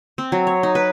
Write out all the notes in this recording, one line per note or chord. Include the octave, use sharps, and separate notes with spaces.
C4
F#3
C#5
D#4
B4